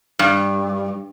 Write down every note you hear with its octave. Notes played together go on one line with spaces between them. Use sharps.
G2